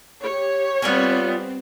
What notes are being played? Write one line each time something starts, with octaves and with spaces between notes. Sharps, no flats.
G4 C#5
G3 B3 C4 F4 D5 G#5